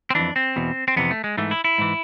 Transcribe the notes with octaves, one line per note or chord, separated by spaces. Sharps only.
C4
F2 E3 D4
C4
E2 B2
C4
F2 C3 E3 B3
A3
G#3
G#2 E3 A3
E4
E4
G#2 E3